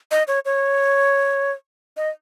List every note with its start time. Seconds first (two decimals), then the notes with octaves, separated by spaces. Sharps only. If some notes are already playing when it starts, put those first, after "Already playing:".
0.11 D#5
0.28 C#5
0.45 C#5
1.97 D#5